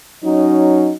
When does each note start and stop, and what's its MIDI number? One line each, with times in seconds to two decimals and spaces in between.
0.23 0.91 54
0.23 0.91 61
0.23 0.91 63